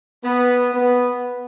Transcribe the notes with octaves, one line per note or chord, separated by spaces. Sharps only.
B3
B3